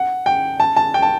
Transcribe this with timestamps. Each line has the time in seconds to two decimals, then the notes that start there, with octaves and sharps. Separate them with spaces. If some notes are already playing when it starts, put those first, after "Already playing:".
Already playing: F#5
0.26 G5
0.60 A5
0.76 A5
0.94 G5
1.02 A5